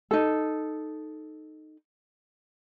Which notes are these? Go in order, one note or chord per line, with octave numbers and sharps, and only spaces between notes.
D#4 A4